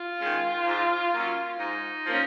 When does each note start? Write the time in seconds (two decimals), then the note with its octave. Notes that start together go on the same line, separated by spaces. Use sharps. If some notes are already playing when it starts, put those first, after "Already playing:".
Already playing: F4
0.19 D#3 G#3 C#4
0.66 G#2
1.13 F#3 A#3 C#4
1.59 G#2 D#4
2.06 F3 A#3 C#4